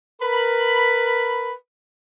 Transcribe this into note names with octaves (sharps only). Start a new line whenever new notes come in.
A#4 B4 B5